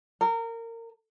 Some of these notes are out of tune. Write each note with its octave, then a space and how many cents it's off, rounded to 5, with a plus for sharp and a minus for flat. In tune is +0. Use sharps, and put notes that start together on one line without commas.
A#4 -25